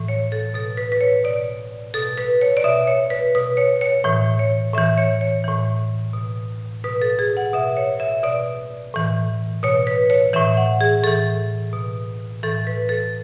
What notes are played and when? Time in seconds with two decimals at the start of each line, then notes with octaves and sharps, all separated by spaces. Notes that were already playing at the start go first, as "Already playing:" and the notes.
Already playing: A2 E3
0.08 C#5
0.32 A4
0.54 B2 A4
0.77 B4
0.92 B4
1.01 C#5
1.24 B2 D5
1.94 B2 A4
2.18 B4
2.41 C#5
2.57 D5
2.64 B2 E5
2.87 C#5
3.10 B4
3.35 B2 B4
3.57 C#5
3.81 C#5
4.04 A2 E3
4.39 C#5
4.74 A2 E5
4.78 E3
4.98 C#5
5.21 C#5
5.44 A2 E3
6.13 B2
6.84 B2 B4
7.01 A4
7.19 G#4
7.37 F#5
7.53 B2 E5
7.77 C#5
8.00 E5
8.23 B2 D5
8.94 A2 E3
9.63 B2 C#5
9.87 B4
10.10 C#5
10.33 A2 E3 E5
10.57 F#5
10.81 G#4
11.04 A2 E3 A4
11.73 B2
12.43 A2 E3 A4
12.67 B4
12.89 A4